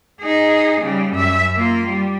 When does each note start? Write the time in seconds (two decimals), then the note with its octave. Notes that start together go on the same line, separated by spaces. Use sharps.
0.21 D#4 G#4
0.81 C#3 G3
1.13 F#2 E5
1.56 A#3 F4
1.87 G3